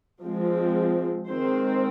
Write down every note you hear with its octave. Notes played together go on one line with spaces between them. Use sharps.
F3 G#3 C4
D#3 G#3 C4 C5